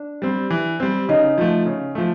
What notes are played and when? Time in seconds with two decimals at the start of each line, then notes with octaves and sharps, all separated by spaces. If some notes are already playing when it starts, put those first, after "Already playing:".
Already playing: D4
0.22 G3 C4
0.50 E3
0.80 G3 C4
1.09 C#3 D#4
1.38 F3 A3
1.66 C#3
1.95 F3 A3